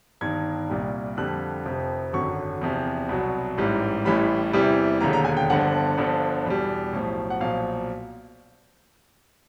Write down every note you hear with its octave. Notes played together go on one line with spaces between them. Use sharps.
G1 G2 D#3 G#6
C2 A#2 G3
F2 D3 G3 F#6
F1 F2 C3 F3
G#1 F#2 D3 F#3 C#6
E2 C3 F3
C2 B2 F#3
A1 G#2 E3 G3
A1 A2 E3 G3 B5
E2 C3 E3 G3
E1 D#2 D3 A#5
A#5
G#5
G5
G1 G2 D3 F3 F#5
G1 G2 D3 F3
E2 B2 G3
B1 A2 F3
F#5
B1 A#2 F3 F5